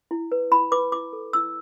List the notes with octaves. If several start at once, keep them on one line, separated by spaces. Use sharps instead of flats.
E4
B4
E4 B5
B4 D6
E4 D6
A4
E4 E6